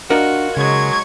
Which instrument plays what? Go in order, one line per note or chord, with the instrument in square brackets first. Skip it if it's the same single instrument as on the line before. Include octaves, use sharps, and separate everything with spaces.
[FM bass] D4 [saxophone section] F4 F#4 [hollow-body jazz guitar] A#4 D#5
[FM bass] C#3 [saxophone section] F#3 G#3 [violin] C#6 G#6